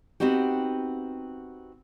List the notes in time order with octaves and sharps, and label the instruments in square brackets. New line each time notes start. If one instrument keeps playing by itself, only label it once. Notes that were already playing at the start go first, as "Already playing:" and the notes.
[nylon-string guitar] B3 C4 D#4 F#4 G4